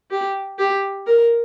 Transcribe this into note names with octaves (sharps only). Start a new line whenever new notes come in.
G4
G4
A#4